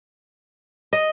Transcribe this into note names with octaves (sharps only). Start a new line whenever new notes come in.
D#5